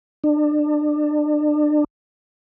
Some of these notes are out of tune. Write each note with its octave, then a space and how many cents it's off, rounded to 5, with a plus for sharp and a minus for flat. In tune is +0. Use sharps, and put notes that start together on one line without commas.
D4 +30